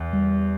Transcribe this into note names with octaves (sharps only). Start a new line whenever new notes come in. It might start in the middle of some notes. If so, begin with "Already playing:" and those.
Already playing: E2
G3